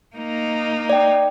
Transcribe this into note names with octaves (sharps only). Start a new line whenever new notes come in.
A#3 D#4
D5 G5